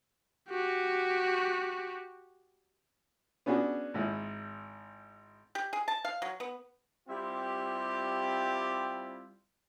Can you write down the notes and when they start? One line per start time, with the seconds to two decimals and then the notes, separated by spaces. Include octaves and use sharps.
0.49 F#4 G4
3.46 B3 C#4 D4 F#4 G#4
3.94 G#1 G#2 E4
5.55 G4
5.73 G#4
5.88 A5
6.05 F5
6.22 F#3
6.40 B3
7.09 G3 C4 E4 F4 G4